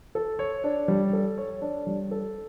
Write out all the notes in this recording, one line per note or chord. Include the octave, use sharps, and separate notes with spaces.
A4
C#5
D4
G3
A4
C#5
D4
G3
A4